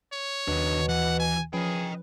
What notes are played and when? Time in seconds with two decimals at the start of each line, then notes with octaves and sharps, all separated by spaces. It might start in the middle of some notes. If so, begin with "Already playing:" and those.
0.13 C#5
0.48 D#2 B2 D#3 D4
0.89 E3 F#5
1.20 G#5
1.53 F3 C#4 G#4 B4 D#5 G5